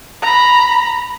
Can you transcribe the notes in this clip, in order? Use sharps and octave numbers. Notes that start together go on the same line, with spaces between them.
A#5 B5